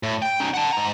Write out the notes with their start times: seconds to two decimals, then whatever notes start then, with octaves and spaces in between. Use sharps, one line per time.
0.03 A2
0.22 G5
0.40 C#4 D#4
0.54 F#5 A5
0.73 G#2 A#5